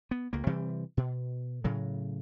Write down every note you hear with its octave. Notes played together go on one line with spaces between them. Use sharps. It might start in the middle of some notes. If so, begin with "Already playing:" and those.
B3
C#2 A#3
C3 E3 G3 C4
B2
A2 C#3 F#3